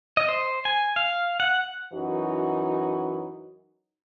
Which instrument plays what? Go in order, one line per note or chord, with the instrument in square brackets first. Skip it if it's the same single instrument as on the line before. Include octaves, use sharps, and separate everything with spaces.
[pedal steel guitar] D#5
C5
G#5
F5
F#5
[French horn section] F#2 E3 D#4 F#4